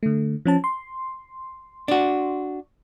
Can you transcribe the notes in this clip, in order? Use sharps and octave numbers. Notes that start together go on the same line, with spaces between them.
D3 A3
F3 C#4 A5
C6
D4 F#4